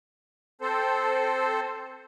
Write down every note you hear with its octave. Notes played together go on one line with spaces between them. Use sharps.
C4 A4 C5